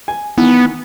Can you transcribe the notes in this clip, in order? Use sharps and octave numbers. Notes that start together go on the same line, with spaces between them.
G#5
D#3 E3 B3